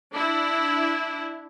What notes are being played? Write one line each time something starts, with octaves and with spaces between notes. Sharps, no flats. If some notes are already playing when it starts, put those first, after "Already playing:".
D4 E4